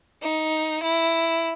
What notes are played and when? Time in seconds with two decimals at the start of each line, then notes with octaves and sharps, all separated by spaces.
0.22 D#4
0.82 E4